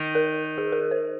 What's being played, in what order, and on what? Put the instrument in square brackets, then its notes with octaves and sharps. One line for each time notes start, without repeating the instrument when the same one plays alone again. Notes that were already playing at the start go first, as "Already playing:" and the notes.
Already playing: [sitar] D#3
[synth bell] A#4
G#4
A#4
C5